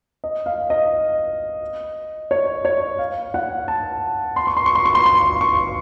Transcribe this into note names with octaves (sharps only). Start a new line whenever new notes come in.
D#5
F5
D#5
C#5
C#5
F5
F#5
A5
C6
C#6
C6
C#6
C6
C#6
C6
C6
C#6